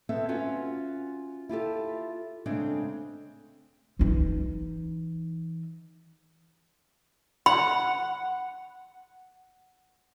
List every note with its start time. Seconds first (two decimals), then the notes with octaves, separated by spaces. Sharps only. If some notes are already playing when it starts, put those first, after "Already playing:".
0.09 B3 C4 A4 E5
0.29 C#4 F4 F#4
1.49 E4 F4 G4 A4
2.46 C#3 G#3 A3 C4 D4
3.99 E3 D#4
7.46 F#5 B5